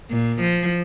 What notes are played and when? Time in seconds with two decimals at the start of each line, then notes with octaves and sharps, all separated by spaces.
0.11 A#2
0.41 F3